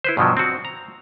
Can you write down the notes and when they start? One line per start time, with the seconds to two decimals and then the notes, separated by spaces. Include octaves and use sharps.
0.04 E4 B4 C5
0.17 G2 B2 F3 F#3
0.37 C4 F#4
0.65 A#5